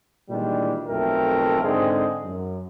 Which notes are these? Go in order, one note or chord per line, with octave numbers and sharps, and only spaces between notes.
A#2 D#3 E3 G3 G#3 D4
B1 F2 A3 A#4 E5 G5
G#2 D3 G#3 C4 G#4 D#5
F#2